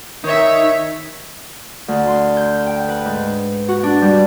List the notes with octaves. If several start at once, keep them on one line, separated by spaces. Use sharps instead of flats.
D#3 D#4 C#5 E5
D2
C6
G6
G5
B4
G#2
F#4
D4
G3